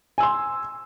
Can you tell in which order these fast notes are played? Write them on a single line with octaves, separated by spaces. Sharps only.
G#5 E6 C6